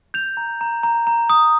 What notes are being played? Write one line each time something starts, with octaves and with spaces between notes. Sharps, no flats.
G6 F7
A#5
A#5
A#5
A#5
D#6